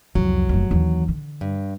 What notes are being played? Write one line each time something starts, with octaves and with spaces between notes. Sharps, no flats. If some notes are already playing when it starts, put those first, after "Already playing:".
C2 F2 F#3
F1 D#2
D#2 E3
D3
G2